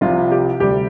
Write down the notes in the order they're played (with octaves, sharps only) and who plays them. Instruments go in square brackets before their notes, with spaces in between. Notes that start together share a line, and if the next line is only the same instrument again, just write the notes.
[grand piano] C2 C3 F3 F4
G4
D2 C3 G3 G4